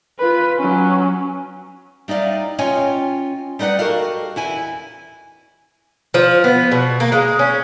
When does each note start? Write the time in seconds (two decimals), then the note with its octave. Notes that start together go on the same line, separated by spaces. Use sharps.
0.18 F4 B4
0.57 F#3 C#4
2.08 G3 D#4 E4 D5 F5
2.58 C#4 F4 C#5 D#5 G5 G#5
3.59 G3 D#4 B4 D5 F#5
3.79 F#4 G4 A4 A#4 D#5 F5
4.36 E2 E4 G#5
6.14 F3
6.44 B3
6.71 B2
7.00 A#3
7.12 G#3
7.39 C#4